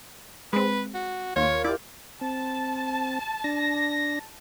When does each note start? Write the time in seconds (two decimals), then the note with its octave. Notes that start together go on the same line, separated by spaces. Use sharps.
0.53 G#3 C4 B4
0.95 F#4
1.36 D#2 F4 A#4 C#5
1.64 E4 G4 A#4 D5
2.21 C4 A5
3.44 D4 A#6